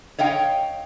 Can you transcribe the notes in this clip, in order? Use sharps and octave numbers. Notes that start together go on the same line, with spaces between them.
C#5 D#5 F5 G5